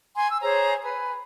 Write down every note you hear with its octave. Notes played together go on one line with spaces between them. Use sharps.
G#5 C6
E6
G#4 C5 C#5 A#5
B4 G#5